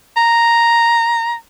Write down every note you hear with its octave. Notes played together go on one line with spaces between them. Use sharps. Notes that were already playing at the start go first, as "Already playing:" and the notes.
A#5